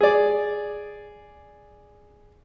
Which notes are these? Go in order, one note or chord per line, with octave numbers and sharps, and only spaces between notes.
G#4 D5